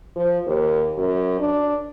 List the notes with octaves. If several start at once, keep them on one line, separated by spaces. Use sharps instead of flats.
F3
D#2
F#2
D4